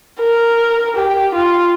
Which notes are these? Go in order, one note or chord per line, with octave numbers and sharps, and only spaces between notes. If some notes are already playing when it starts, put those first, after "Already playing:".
A#4
G4
F4